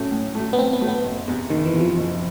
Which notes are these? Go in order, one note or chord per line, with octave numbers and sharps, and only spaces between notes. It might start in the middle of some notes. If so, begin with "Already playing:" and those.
Already playing: A2 F#3 A3 C#4
A2
F#3 A3
B3
A2 C4
B3
F#3 A3
B3
F#1
E2 C3
F#1 D#3
E3
E2 C3
F3
F#1